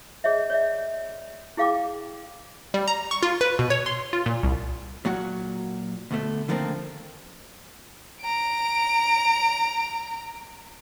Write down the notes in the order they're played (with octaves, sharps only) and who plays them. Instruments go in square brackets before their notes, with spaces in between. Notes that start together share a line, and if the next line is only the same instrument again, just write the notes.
[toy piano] G#4 C#5 D#5 E5
C#5 D5 E5
E4 G#4 F5 G5 D6
[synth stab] G3
A#5
C#6
F4
B4
B2
C#5
C6
F4
A#2
C2
[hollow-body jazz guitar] A#2 F#3 F#4 F#5
D2 B2 A3
D3 D#3 F3 A3 A#3 C4
[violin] A#5 D7